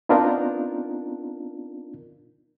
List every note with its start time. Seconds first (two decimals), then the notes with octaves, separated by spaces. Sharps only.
0.09 B3 C4 D4 D#4 F4 A#4